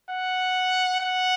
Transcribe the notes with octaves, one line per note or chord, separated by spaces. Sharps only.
F#5
F#5